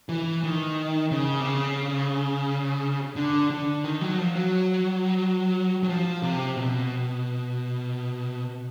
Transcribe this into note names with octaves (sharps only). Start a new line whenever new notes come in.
E3
D#3
C#3
C3
C#3
D3
D3
D#3
F#3
F3
F#3
F#3
F3
C3
B2